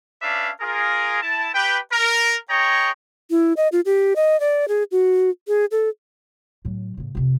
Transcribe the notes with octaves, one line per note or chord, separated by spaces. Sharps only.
C#4 D4 B4 D5 E5 F5
F4 G#4 A#4
E4 A5
G4 B4 G5
A#4
G#4 C#5 D#5 G5 A#5 C#6
E4
D#5
F4
G4
D#5
D5
G#4
F#4
G#4
A4
A2 F#3
A2 C#3
F2 C3